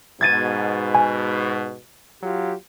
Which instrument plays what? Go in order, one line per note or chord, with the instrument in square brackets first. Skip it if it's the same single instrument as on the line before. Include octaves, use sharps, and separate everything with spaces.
[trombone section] G#2 B2 [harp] G#6 A6 D#7
[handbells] G#5
[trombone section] F#3 F4 G4